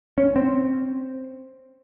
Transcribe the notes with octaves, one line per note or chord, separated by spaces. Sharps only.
C#4
C4